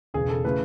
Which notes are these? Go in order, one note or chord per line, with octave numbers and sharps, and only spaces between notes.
E1 E2 C#3 G#4
A4
C#3 E3 A3 B4